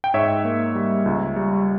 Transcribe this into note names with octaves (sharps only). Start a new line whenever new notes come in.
G5
G#2 C#5 E5
A#3
G3
C#2
G3